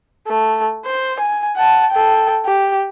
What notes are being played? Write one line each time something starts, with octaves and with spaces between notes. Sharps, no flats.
A3
C5
G#5
F#5 A5
A4 G5
G4